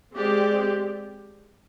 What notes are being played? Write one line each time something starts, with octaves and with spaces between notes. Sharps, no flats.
G#3 C4 G4 D5